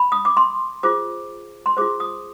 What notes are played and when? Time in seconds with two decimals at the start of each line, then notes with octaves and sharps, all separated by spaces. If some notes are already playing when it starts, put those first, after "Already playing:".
Already playing: B5
0.12 D#6
0.25 D6
0.37 C6
0.83 F4 G#4 C5 D6
1.66 C6
1.77 F4 G#4 C5 D6
2.00 D#6